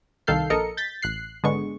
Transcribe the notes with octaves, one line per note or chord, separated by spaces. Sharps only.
C2 D#3 A4 F5 G6 C7
A#1 A4 A#4 D#5 C#7
G6 A6 B6
A1 F#6 C7
G#1 D3 G#3 B3 C#6